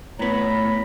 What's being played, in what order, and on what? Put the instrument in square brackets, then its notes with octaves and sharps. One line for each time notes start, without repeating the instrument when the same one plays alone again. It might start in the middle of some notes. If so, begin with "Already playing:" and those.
[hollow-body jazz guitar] A2 B3 [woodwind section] C#5 A#5 B5